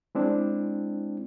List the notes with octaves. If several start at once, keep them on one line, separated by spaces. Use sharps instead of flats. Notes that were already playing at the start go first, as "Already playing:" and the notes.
G#3 C4 D4 E4